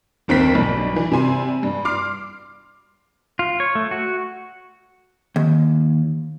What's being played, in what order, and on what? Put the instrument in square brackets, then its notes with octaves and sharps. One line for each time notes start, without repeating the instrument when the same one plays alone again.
[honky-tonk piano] G1 D#2 C4 A#4 B6
B1 G2
E3
C3 G3 G#5 C6
G2
C6 D6 F6 C7
[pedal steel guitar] F4
C#5
A3
F#4
[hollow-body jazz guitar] D#2